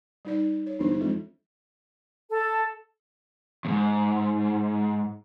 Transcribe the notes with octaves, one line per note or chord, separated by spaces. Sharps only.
G3 D#4 D5
C#5
G1 E3 D4 D#4
F2 G#3
A4
D#2 G#2